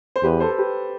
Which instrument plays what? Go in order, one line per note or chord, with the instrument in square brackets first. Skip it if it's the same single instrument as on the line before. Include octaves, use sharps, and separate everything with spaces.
[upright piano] C5
[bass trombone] E2 [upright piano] G4 B4
[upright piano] A4 C5
A4
G4 B4